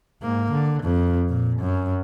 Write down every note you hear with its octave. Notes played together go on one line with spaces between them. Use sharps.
G#2 A#3
D3
F2
A#2
F#2